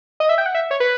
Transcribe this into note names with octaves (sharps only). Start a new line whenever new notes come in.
D#5
E5
G5
F#5
E5
C#5
B4